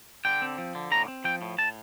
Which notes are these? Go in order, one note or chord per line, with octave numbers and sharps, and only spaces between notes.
D3 G5
C4
F3
D3
A2 A#5
C4
F3 G5
A2
A2 A5